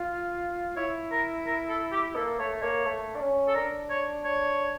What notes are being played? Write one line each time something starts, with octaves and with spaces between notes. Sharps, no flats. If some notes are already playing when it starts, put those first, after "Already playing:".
Already playing: F4
E4 C#5
A#4
A#4
A4
G4
A#3 A4
A3 C#5
A#3 C#5
A3
D4
C#4
A4
D4 A#4
C#5
C#5